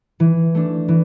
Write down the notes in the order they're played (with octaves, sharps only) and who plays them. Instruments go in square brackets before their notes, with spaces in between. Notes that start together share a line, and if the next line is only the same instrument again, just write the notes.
[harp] E3
A3 D4
E3